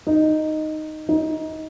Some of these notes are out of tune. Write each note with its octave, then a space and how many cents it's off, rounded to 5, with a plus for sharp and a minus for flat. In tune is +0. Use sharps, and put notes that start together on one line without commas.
D#4 -5
D#4 +20